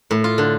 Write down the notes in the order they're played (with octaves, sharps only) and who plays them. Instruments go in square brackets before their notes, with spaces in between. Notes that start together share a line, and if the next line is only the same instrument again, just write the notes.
[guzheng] A2
F4
D3